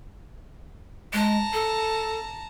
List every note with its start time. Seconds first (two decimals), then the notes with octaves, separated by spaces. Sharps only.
1.13 G#3 A5 A#5
1.53 A4